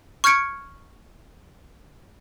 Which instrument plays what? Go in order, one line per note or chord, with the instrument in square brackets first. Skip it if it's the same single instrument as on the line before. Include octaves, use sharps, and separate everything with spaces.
[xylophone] C#6 F6 G6 G#6 C#7 D7